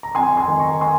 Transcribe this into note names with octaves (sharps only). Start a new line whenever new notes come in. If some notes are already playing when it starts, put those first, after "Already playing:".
A#5
F2 G#5 C6
G#5 C6
D#3
A#5 C#6
G#5 C6